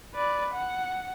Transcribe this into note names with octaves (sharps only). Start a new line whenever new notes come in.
B4 D5
F#5